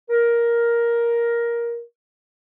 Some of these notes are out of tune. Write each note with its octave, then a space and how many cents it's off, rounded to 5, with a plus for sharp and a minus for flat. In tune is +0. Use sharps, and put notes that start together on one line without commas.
A#4 +10